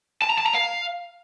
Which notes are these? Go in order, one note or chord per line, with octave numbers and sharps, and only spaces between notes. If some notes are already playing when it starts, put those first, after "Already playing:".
A5
A#5
A5
A#5
F5